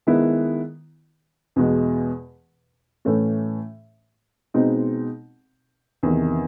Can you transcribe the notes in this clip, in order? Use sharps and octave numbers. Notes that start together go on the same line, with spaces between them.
D#3 G#3 B3 E4
E2 B2 G#3
A2 E3 A3 C#4
B2 G#3 C4 D#4
E2 C3 D#3